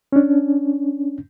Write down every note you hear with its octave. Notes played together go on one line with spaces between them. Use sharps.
C#4 D4